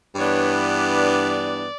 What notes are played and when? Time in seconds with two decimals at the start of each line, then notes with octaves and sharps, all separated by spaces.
0.16 G2 E3 B3 D4 C#5
0.54 D5